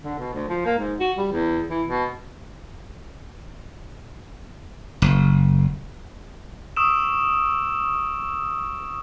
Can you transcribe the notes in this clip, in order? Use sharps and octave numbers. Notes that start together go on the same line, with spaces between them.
D3
B2
D2
F3
A#3
G#2
F#4
G3
E2
E3
B2
F#1
C#6 D#6 E6 D7 E7